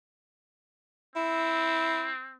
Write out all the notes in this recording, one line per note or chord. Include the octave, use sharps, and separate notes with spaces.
C4 E4